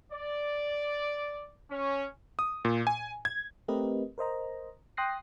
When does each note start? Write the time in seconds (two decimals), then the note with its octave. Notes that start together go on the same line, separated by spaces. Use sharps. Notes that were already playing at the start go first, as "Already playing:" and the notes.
0.11 D5
1.70 C#4
2.39 D#6
2.65 A#2
2.87 G#5
3.25 G#6
3.68 A3 C4 G4 A#4 B4 D#5
4.18 A#4 C5 D#5 A#5
4.97 G5 C6 D#6 F#6 A#6 C7